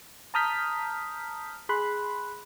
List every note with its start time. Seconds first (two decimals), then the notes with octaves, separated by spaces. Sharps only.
0.34 A5 A#5 D#6 F6 G6 B6
1.69 G#4 B5 C6 F#6